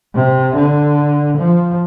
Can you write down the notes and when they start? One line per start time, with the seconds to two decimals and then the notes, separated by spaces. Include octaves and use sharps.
0.15 C3
0.56 D3
1.38 F3